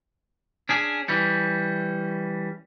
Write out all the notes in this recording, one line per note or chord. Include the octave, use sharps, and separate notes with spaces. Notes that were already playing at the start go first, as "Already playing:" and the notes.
C#4 D4 G#4
E3 G3 C#4